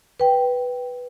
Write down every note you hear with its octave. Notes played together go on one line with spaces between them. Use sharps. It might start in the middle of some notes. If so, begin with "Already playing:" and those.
B4 G5